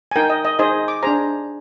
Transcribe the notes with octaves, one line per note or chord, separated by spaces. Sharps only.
G#5
D#4 A#4 G5
D#5
D#5
D#4 G#4 C5 D#5
D6
D4 G#4 C5 A#5